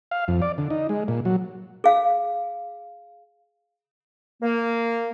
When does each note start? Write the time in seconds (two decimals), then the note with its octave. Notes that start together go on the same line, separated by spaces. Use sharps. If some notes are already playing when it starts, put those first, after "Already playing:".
0.11 F5
0.28 F2
0.42 D5
0.58 D3
0.70 D#4
0.89 G#3
1.08 A#2
1.25 F#3
1.84 G#4 F5
4.41 A#3